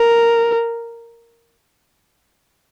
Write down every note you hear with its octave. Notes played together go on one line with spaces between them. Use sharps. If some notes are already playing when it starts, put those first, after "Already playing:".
Already playing: A#4